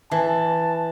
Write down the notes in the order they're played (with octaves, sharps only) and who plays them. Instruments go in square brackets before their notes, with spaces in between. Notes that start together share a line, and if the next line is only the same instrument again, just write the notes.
[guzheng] E3 [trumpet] A5